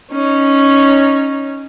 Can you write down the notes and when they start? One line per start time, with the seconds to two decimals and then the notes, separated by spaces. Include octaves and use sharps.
0.12 C#4 D#4 C#5